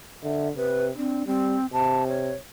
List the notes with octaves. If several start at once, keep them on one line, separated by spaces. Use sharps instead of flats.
D3 E5
C3 B4
C4 D4
G3 C4
C3 A5
C#5